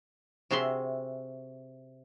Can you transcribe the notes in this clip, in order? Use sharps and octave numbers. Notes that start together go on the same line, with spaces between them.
C3 F#4 G#4 E5 C6